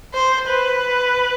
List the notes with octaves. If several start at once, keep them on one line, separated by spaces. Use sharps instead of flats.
C5
B4